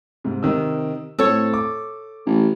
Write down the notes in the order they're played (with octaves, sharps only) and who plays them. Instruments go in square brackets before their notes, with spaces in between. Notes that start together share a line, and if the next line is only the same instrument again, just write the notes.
[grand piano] G#2 C3
C3 D#3 E6
[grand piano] A2 C4 [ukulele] A4 C#5
[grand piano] D6
[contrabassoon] A1